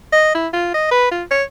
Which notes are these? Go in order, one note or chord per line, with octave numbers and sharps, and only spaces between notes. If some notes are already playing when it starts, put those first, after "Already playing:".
D#5
E4
F4
D#5
B4
F4
C#5